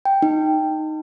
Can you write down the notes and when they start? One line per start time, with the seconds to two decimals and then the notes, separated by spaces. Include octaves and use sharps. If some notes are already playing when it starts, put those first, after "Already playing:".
0.05 G5
0.22 D#4